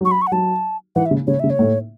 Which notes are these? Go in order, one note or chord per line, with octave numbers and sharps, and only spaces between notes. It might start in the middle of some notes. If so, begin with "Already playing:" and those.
F#3 C#6
B5
C#6
F#5
F#3 A5
E3 F#5
E5
C#3
C#3 C#5
C#3 E5
C#5
A2